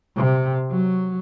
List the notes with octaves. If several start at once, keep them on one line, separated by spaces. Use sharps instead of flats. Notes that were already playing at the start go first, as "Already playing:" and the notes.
C3
F#3